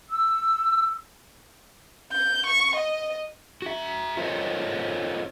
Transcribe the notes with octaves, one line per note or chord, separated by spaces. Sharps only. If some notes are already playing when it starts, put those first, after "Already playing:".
E6
G6
C#6
D#5
F#4 E5
F4 A4 A#4 C5 C#5 D#5